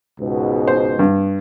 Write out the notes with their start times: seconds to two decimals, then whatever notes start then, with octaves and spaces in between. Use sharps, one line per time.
0.20 C#2 G#2 B2
0.67 C5
0.99 G2